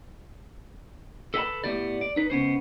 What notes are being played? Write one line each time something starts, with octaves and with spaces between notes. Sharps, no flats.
A4 B4 D#5 F#5 A5 B5
A2 A3 B3 G4 D5
D5
D#4 B4
C#2 B3 C#4 C5